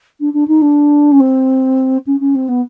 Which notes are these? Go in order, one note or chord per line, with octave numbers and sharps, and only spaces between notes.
D4
D4
D#4
D4
C#4
C4
C#4
C#4
C4
B3